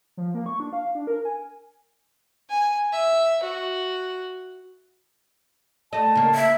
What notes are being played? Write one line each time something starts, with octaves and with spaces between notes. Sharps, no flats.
F3
A#3
C#6
D4
F5
D4
A#4
G#5
G#5
E5
F#4
A3 D#5 A5
C#3 A#3
E5